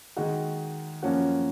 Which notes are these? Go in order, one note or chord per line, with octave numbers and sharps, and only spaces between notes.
D#3 G#3 D#4 F#4
F#2 F3 A#3 C#4 F#4